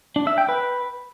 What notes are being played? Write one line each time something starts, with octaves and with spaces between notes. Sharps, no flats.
D4
E5
G5
B4